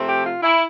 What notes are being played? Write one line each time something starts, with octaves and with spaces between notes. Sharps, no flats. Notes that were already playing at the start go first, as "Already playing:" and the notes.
Already playing: C3 F3 A3 C4
G4
F4
E4